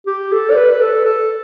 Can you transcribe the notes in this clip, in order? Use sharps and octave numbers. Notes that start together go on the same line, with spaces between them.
G4
A4
D5
B4
B4
A4
A4